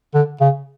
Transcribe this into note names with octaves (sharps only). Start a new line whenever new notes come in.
D3
C#3